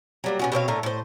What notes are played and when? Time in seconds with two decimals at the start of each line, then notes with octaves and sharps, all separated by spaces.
0.24 F#3 G3 A#3
0.39 B2 C#4 F#4
0.52 B2 C4 C#5 F5
0.68 A2 D3 A3 A#4
0.83 A2 C5